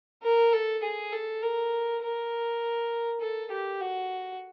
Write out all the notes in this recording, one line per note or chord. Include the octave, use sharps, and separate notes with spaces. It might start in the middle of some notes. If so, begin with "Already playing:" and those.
A#4
A4
G#4
A4
A#4
A#4
A4
G4
F#4